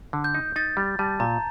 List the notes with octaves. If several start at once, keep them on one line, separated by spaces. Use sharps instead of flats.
D3
G6
D#4
D#4 A6
G3
G3 A5
A#2 A#5